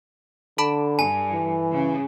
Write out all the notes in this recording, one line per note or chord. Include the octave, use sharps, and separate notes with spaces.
D3 A4 A5 B5
G2 G#5
E3
C#3